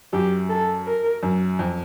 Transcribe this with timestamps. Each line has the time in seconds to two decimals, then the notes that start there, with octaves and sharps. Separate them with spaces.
0.13 F#2 G4
0.49 A4
0.87 A#4
1.23 F#2
1.59 F2